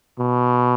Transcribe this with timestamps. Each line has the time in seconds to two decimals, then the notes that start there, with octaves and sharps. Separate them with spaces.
0.19 B2